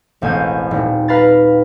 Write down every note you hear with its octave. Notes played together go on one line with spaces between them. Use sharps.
E1 A1 C4 G#5 G6
D#1
B4 F5 A#5 B5 A6